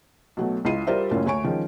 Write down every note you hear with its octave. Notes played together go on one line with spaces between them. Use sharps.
B1 F#3 A3
C#2 E4 F4 C7 D#7
G3 F4 A#4 C5 D5 E5
F#1 F#2 A2 C#4 F4
D2 C#5 G#5 C#6 D7
D#3 F3 G#3 C#4